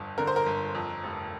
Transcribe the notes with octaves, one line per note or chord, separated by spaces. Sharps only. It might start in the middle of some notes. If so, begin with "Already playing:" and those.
Already playing: G1 F2
D3 A#4
C5
A#4
G1
F2
F1